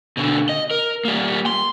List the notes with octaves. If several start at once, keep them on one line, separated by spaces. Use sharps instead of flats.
B2 D3
D#5
A#4
G3 A#3
C6